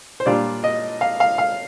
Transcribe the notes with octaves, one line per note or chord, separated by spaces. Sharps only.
C5
A#2 G3 D4 F4 D5
D#5
F5
F5
F5